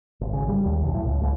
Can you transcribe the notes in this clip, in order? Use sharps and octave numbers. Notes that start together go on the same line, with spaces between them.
G#1
C#3
G3
D#2
B1
A2
C#2
C#2